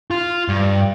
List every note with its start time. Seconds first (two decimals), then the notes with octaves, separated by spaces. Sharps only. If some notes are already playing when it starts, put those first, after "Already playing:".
0.11 F4
0.49 G2